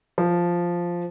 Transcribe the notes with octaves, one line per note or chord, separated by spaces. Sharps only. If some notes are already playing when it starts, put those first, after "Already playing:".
F3